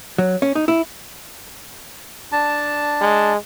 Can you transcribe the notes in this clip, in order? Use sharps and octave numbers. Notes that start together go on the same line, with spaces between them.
F#3
C#4
D#4
E4
D4 A5
G#3